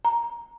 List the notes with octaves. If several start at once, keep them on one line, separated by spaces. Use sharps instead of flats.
A#5